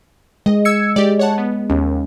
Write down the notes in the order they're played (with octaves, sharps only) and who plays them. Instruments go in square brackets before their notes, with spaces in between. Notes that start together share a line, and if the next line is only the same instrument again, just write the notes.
[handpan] G#3 [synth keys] D#5
[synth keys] E6 G#6 C#7
[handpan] G#3 [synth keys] G4 D5
[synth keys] C#5 F#5 A5
B3
[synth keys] D#2 [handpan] C#4